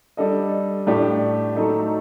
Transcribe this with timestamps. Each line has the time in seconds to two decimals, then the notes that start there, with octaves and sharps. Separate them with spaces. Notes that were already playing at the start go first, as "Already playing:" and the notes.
0.17 G3 D4 A4 D#5
0.87 A2 A3 D4 G4 D5
1.55 F#3 A3 D#4 A4 D#5